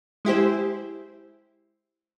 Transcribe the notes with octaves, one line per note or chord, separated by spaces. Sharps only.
G#3 E4 G4 C5